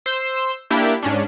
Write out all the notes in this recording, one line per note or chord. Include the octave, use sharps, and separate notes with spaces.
C5 C6 E6
A#3 D4 E4 G4
G#2 C#4 D4